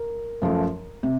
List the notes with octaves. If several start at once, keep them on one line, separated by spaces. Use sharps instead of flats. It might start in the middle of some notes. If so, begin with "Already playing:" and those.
Already playing: A#4
F#2 F3 A3
C3